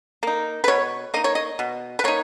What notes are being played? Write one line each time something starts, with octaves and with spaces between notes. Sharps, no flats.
A#3 D#4
B4
B2 C#5
A#3 D#4 D#5
C#5
D#5
B2
B4
A#3 D#4 C#5